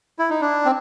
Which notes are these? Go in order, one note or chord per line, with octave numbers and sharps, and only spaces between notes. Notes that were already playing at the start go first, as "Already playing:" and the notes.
E4
D#4
D4
C4